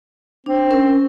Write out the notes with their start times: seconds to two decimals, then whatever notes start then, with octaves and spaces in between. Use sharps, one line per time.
0.46 C4 D4
0.70 C#4 A#4 C5